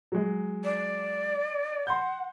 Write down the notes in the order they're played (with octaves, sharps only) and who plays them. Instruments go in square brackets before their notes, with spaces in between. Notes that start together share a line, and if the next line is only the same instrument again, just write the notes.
[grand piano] F#3 G#3
[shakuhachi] D5
[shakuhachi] F#5 [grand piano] C6 G6